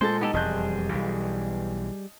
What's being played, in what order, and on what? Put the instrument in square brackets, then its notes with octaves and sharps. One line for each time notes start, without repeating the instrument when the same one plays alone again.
[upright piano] A#2 A4 A6 [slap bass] G#3 [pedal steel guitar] C5
[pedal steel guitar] B3 G4 A4 [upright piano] D#4
[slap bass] E1 F2 [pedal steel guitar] G3 G#4 F#6 [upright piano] D#5 A5 G6
[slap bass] B1 E3